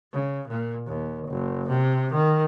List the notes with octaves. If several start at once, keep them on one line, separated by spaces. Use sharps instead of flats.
C#3
A#2
D#2
F#1
C3
D#3